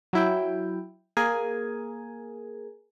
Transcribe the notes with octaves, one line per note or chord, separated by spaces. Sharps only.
F#3 E4 G5
A#3 G#4 A#4 G#5